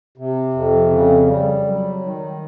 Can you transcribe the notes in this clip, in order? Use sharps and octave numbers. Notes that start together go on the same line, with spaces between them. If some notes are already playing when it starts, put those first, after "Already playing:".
C3
F2
C#3
G3
F#3
D#3